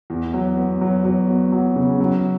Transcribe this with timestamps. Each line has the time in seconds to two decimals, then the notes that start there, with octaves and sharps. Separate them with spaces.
0.10 E2
0.34 F#3
0.57 B3
0.81 F#3
1.05 F#3
1.29 B3
1.52 F#3
1.76 C#3
2.00 F#3